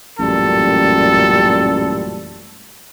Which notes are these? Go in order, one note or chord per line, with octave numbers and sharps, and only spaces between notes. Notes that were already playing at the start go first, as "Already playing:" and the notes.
A1 F#2 A#2 G3 A4